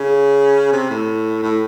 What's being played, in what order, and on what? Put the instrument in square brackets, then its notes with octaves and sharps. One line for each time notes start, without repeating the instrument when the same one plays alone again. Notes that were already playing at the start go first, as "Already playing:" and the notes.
Already playing: [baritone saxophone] C#3
C3
A2
A2